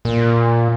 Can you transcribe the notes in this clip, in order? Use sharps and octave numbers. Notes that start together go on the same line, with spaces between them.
A#2